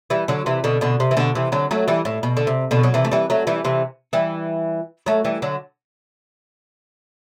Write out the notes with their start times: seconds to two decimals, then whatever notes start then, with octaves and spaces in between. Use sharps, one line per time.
0.10 E3 G3
0.28 D3 F#3
0.46 C3 E3
0.64 B2 D3
0.81 B2 D3
1.00 C3
1.11 E3
1.17 B2 D3
1.35 C3 E3
1.52 D3 F#3
1.71 F#3 A3
1.88 E3 G3
2.05 A2
2.23 B2
2.37 D3
2.47 C3
2.71 B2 D3
2.83 F#3
2.94 C3 E3
3.05 A3
3.11 E3 G3
3.30 F#3 A3
3.47 E3 G3
3.65 C3 E3
4.13 E3 G3
5.06 F#3 A3
5.24 E3 G3
5.42 D3 F#3